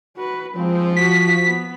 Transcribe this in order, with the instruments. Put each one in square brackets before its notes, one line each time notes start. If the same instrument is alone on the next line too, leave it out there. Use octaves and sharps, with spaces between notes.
[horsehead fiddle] F#4 B4
[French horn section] F3 [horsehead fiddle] G#3 C4
[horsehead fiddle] F#4 [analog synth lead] B6
[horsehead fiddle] B3